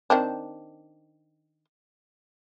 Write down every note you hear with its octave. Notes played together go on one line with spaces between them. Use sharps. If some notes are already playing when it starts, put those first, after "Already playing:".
D#3 C4 D4